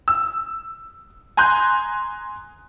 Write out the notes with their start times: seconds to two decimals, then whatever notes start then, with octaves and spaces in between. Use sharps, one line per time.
0.08 E6
1.37 G#5 A#5 C6 F#6 G6